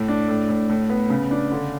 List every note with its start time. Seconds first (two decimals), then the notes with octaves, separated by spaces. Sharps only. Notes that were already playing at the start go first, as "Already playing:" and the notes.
Already playing: A2
0.08 D4
0.28 A2
0.49 A2
0.69 A2
0.89 B3
1.10 C#3
1.31 D4
1.52 D3